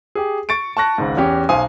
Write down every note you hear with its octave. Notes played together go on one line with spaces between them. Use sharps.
G4 G#4
C#6 A6 C#7 D7
A5 C#6 F#6 A#6
G#1 C#2 G#2
E2 C#4 G4
B1 C5 F5 G#5 D#6